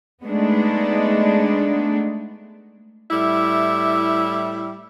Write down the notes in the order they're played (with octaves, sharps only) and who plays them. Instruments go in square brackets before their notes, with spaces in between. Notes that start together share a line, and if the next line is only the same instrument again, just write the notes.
[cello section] G#3 A3 B3 D4 D#4
[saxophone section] A2 G3 E4 E5